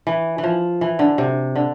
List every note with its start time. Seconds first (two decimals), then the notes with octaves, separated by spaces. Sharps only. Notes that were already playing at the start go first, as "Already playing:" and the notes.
0.07 E3
0.38 E3
0.43 F3
0.81 E3
0.99 D3
1.18 C3
1.55 D3